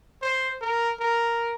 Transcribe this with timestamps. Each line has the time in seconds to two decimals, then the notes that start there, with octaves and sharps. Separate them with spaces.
0.22 C5
0.61 A#4
1.00 A#4